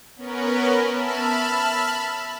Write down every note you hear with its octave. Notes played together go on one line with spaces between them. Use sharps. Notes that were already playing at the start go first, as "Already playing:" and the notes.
B3 C#4 A#4 B4
E5 A5 B5 F6